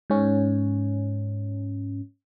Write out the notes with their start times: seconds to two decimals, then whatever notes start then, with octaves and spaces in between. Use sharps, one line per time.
0.10 G#2 C#4